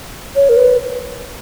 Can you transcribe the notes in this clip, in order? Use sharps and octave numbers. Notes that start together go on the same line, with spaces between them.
C#5
A#4
B4